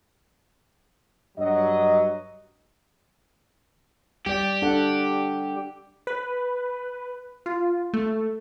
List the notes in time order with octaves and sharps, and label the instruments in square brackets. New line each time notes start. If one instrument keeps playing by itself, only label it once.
[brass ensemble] G2 F#3 D#5
[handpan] G3 D5 [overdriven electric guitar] G4
[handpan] D4 A4 F#5
[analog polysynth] B4
F4
A3